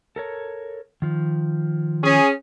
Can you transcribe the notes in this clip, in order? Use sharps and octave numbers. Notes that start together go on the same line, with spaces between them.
A4 A#4 C#5
D#3 F3
C#4 G#4